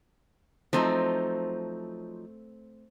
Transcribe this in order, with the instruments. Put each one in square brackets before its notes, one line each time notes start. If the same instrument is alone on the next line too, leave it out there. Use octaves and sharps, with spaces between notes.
[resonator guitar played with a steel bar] F3 F#3 D#4 [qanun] A3 C4